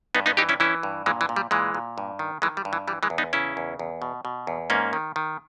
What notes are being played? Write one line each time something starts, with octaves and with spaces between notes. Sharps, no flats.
G2 B3 D#4
B3 D#4
E3 D#4 G4
C#4 E4
E3 C#4 E4
G2
A#2 E3 G#3
E3
A#2
G3
A#2 E3 G#3
A#2
G2
D#3
D#3 E3 G#3
G3
G2
E3
E3 G3
E3 G#3
E2
B3 D#4
C#3 C#4 E4
E2
E2
B2
B2
E2
G#2 A#3 C#4
D#3
D#3